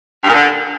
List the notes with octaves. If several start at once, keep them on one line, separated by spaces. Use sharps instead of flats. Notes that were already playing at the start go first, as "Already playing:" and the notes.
G2
A#2
D3